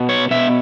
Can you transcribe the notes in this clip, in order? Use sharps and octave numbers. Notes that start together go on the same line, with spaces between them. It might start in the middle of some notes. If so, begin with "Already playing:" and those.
Already playing: B2
C#5
B2 E5